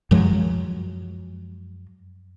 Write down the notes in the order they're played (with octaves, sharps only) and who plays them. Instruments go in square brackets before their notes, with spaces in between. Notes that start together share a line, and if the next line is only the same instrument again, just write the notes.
[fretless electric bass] F#2 F3 F#3 G#3